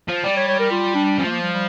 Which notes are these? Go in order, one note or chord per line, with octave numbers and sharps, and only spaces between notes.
F3
G3 D5
C#5
C#5
A#4
F4
D4
F3 C#4
A3
A#3
G3
G3